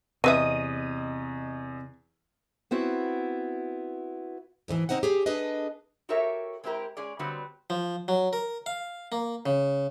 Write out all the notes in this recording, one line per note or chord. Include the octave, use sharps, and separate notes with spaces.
E2 C3 C4 B4 D#5 E5 D#6 D#7
B3 C4 E4 F#4
G#2 B2 D3 E3
C4 D4 D#4 C5 F#5
G4 G#4 C#5
D4 G#4 A4 B4 D#5
F#4 G4 A4 A#4 C#5 E5
G#3 C4 E4 G4 A#4
G#3 C#4 G#4 D5
D3 F#3 G3 B3 C4
F3
F#3
A#4
F5
A#3
C#3